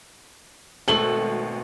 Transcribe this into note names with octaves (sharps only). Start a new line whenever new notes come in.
G#1 B2 A3 F#7